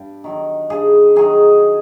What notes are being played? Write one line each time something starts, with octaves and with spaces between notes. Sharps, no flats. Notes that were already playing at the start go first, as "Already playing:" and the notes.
Already playing: G2
D#3 F#3
G2 G#4
D#3 F#3 G#4